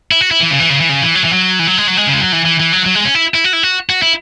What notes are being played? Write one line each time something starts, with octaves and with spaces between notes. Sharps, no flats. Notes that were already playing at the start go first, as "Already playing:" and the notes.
E4
F#4
E4
E3
C#3
E3
C#3
E3
C#3
E3
F#3
E3
F#3
E3
F#3
G#3
F#3
G#3
C#3
G#3
F#3
E3
E3
E3
F#3
F#3
G#3
C#4
E4
E4
F#4
E4
F#4
F#4
E4